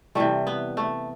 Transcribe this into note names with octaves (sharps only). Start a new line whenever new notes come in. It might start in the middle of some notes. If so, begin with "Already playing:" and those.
C3 E3 G3 A3
B3
A3